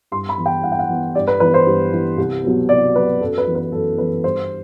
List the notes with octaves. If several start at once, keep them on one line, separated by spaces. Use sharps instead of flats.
G2 C6
B5
E3 B3
G5
G2 F#5
G5
F#5
E3 B3
G2 D5
B4
E3 B3 B4
C5
G2
E3 B3
C2
B2 F#3 B3
C2 D5
B2 F#3 B3 B4
F#2 A4
B4
E3 B3
B4
F#2 A4
E3 B3 B4
G2 C5